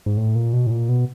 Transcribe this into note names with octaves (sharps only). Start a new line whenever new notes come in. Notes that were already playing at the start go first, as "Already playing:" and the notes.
G#2
A2
A#2
B2
A2
A#2
B2